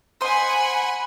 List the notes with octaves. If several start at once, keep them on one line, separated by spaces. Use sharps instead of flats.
C5 D#5 F#5 G#5 B5 C6